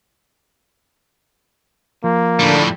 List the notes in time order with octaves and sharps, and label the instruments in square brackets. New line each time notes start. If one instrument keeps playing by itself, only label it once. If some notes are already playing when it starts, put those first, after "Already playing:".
[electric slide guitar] F3 [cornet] A#3
[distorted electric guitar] A2 G3 [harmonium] D3 D4